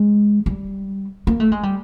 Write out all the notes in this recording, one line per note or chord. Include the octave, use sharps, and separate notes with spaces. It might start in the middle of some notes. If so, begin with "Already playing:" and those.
Already playing: G#3
G3
A#3
A3
G#3
G3